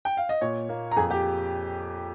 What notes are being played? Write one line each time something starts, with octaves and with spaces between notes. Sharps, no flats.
G5
F5
D#5
A#2 C#5
A#3
A#5
F2 G#4 G#5
G4 G5